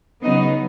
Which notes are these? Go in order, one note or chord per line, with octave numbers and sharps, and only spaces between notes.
C#3 F#3 B3 D#4 D#5